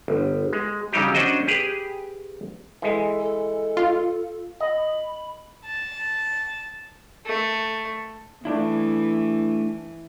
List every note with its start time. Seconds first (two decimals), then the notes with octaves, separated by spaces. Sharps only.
0.08 G1
0.53 G#3
0.93 C#3 F#3 G3 D#4 G4
1.14 C#4 D4 F#4 C5 D#5
1.48 G4 G#4 B4
2.82 E3 G#3 A4
3.19 A4
3.77 F4
4.60 D#5 B5
5.66 A5
7.26 A3
8.45 E3 A3 D4 E4